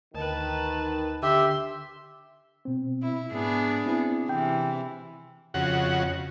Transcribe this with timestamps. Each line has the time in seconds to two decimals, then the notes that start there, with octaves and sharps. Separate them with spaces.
0.15 D2 D#3 B4 A5
1.22 D3 G4 E5 C6
2.65 B2 C4
3.02 E4
3.32 G#2 B3 D4 G#4
3.86 C4 E4
4.29 C3 E3 G5
5.54 F2 C#3 F#4 F#5